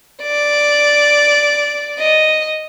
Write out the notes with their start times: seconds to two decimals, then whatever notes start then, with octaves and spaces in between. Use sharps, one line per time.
0.23 D5
1.99 D#5